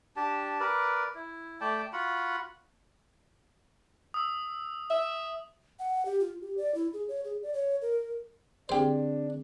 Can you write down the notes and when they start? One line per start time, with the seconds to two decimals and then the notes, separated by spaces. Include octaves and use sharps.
0.16 D4 G4 A5
0.60 A#4 B4 D5
1.15 E4
1.61 A3 D5 G5 A5
1.93 F4 F#4 F#5 B5
4.14 D#6 E6
4.90 E5
5.79 F#5
6.05 G4
6.20 F4
6.41 G4
6.57 D5
6.74 E4
6.93 G#4
7.08 C#5
7.24 G#4
7.42 D5
7.54 C#5
7.81 A#4
8.69 D3 C4 D4 G4 G#4 C5